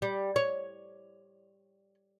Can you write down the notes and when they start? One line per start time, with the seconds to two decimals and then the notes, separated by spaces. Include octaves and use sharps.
0.02 G3
0.36 C#5